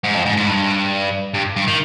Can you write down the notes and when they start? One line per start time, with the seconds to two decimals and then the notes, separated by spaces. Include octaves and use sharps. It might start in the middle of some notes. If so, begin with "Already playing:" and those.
0.04 G#2
0.15 F2
0.26 G#2
0.37 G#2
0.47 G2
1.34 G2
1.56 G2
1.68 D#3